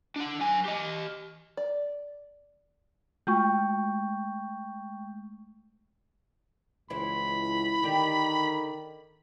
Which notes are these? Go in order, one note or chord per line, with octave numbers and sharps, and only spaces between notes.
D4 F#5
F#3 G#5
G4 D#5
D5
G#3 A3 G5 C#6 G6
C#2 E3 E4 C5 B5
D3 D#3 G4 A#4